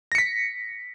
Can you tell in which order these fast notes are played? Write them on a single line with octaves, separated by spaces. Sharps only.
A#6 C#7 B6